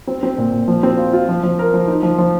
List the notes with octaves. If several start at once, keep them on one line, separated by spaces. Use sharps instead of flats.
C4
C4
A#2
A#2
F3
C4
F4
F4
F3
F3
A#4
F3
D#4
F3
F3